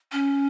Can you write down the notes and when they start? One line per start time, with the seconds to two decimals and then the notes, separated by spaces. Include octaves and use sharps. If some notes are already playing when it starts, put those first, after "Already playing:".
0.12 C#4